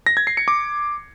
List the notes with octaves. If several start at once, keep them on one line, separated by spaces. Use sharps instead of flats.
A#6
G#6
C7
C#7
D6